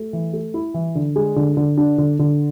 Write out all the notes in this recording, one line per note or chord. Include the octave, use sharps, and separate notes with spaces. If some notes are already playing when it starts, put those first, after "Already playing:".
Already playing: A3
E3
A3
E4
E3
D3
G#3
D3
D3
D4
D3
D3